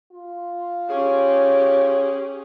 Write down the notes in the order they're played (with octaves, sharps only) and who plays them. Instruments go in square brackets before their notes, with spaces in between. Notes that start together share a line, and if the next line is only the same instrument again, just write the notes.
[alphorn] F4
[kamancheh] C#4 G4 [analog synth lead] G#4 [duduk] C#5